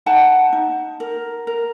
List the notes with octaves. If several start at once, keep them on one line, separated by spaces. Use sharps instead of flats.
D#4 F#5 A5
D#4
A#4
A#4